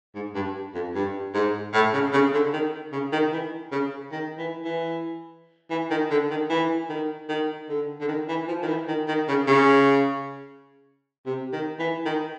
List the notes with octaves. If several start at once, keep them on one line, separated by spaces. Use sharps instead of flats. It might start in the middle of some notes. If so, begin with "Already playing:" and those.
G#2
G2
F2
G2
G#2
A2
C#3
C#3
D3
D#3
C#3
D#3
E3
C#3
D#3
E3
E3
E3
D#3
D3
D#3
E3
D#3
D#3
D3
D3
D#3
E3
F3
D#3
E3
D#3
D#3
C#3
C#3
C3
D#3
E3
D#3